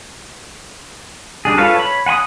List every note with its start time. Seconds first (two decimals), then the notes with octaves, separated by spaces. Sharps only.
1.45 G3 D4 G#4
1.58 F4 A4 B4 C#5 F5
1.76 C#5 B5
2.06 F#5 G#5 B5 D#6